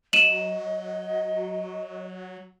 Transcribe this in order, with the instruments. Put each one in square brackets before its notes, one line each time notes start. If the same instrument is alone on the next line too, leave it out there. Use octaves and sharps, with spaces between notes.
[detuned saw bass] F#3 [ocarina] D#5 [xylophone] D#7 E7 F#7